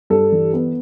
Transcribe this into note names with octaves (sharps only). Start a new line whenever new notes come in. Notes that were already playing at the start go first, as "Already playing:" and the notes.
G2 A4
E3
B3